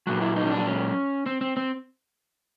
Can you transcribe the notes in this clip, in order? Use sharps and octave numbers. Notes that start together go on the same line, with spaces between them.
A#2 F#3 F#4
E4
D#4
C#4
D4
C#4
C4
C4
C4